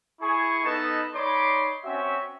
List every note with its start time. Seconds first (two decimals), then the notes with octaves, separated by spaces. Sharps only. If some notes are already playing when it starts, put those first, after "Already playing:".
0.21 E4 G#4 G#5 C#6
0.64 B3 D#4 A4 B4 D#5 A5
1.14 D#4 C#5 D5 B5 C6 D6
1.85 C4 C#4 F#4 E5